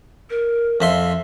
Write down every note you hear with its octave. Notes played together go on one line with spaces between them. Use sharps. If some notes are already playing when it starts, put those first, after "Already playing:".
A#4
F2 E5 F5 C6